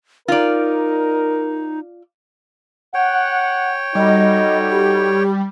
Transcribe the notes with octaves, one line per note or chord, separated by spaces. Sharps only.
D#4 F4 A#4 D5
C#5 F#5 G5
G3 D#4 F#4 A4 D#5
G4